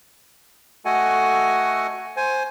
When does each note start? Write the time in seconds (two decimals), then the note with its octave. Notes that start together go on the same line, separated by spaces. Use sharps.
0.85 A3 F#4 A4 D#5 F#5 G#5
2.17 C5 G#5